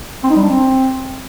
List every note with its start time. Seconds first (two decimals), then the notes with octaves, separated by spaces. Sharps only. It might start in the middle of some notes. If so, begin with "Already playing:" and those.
0.23 C4
0.30 D#4
0.36 G3
0.43 D4
0.49 C4